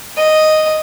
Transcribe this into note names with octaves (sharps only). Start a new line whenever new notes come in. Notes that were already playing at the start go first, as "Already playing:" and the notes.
D#5